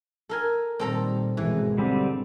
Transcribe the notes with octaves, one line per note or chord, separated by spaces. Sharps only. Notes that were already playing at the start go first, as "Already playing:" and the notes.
A4 A#4 G#5
A#2 D#3 G3 C4 A4 A#5
G#1 B2 E3 G#3
D3 G3 C4